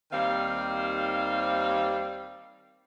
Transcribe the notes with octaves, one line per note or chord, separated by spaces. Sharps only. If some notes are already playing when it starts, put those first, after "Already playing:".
D#2 D#3 G3 C4 F5